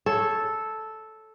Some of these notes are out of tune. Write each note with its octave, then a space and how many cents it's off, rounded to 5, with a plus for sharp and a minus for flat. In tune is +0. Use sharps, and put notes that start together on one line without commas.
A4 -5 C#5 +0